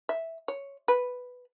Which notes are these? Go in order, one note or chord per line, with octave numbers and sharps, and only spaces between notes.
E5
C#5
B4